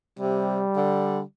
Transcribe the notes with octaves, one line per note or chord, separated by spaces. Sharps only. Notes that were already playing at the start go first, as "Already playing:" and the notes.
C3 G3
D3